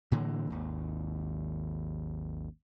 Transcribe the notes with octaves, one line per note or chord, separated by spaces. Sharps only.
A2 D3 E3 A#3
G#1 D#2